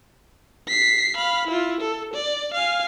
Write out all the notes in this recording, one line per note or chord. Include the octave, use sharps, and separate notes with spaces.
B6 C7
F5 B5
E4 F4
A4
D5
F5 G#5